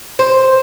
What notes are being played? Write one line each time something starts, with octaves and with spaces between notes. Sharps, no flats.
C5